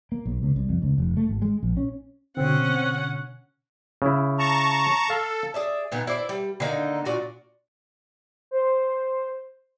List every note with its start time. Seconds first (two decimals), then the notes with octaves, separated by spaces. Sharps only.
0.12 A#3
0.26 B1
0.43 C#2
0.56 C2
0.69 F2
0.82 C#2
0.98 F1
1.17 A3
1.29 G#1
1.42 G#3
1.63 A#1
1.77 C#4
2.37 B2 D3 C4 C#4 F#5
4.02 C#3 E4
4.39 A5 A#5 C#6
5.10 A4 F5
5.54 G#4 D5 E5
5.92 A#2 D#3 B3
6.07 E4 C5 D5
6.29 G3
6.60 D3 D#3 A#3 D#4
7.05 A#2 F4 F#4 D5
8.51 C5